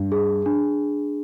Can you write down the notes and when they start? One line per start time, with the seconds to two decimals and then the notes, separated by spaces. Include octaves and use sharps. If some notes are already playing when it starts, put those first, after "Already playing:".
Already playing: G2
0.12 G#4
0.46 D4